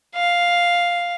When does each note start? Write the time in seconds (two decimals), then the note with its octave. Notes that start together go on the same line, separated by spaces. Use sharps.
0.15 F5